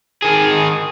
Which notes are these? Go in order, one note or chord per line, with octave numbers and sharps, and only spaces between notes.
D#3 G#4